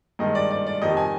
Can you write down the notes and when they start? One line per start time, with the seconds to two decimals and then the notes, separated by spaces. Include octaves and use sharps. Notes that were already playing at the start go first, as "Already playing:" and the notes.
0.19 G2 D#3 G#3 D#5
0.35 D5
0.50 D5
0.67 D5
0.82 F2 D#3 G3 D#5
0.97 G#5